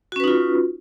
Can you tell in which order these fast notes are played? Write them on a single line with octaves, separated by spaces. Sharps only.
F#4 C#4 B4 D#4 F4